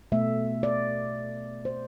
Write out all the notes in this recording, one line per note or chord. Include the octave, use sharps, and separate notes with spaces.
B2 A3 E5
D5
C5